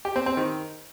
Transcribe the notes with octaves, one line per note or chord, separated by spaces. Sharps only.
G4
C4
C4
D#3